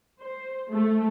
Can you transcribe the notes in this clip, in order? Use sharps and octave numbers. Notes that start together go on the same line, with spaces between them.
C5
A3